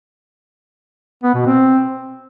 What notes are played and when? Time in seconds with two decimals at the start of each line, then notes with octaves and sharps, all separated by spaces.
1.23 B3
1.35 B2
1.46 C4